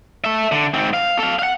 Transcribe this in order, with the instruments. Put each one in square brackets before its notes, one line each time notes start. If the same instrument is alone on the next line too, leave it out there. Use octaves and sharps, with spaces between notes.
[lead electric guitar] A4 E5
D3
G#2 C4
F5
A4 F5
F5 F#5